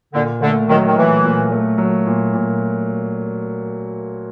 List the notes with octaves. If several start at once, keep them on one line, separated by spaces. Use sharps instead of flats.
A#2 D3
D3 A3
D#3 F#3
D#3
A#2 E3
A#2
A3
F#3
A#2
A#2